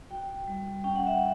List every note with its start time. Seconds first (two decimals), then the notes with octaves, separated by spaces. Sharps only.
0.10 F#4 G5
0.48 G3
0.84 C#4 G5
0.96 F#5
1.07 E5
1.19 F#5